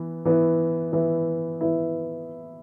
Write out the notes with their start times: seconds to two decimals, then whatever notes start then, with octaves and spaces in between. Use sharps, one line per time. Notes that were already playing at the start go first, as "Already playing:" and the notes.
Already playing: E3 B3
0.25 E3 B3 E4
0.92 E3 B3 E4
1.61 E3 B3 E4